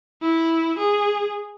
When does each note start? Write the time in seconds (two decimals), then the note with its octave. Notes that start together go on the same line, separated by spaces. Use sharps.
0.22 E4
0.79 G#4